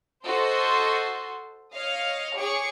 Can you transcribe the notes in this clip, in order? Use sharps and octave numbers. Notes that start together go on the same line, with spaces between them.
F#4 A4 C5 D#5 C6
C#5 D#5 F5
G#4 C#5 C#6 D6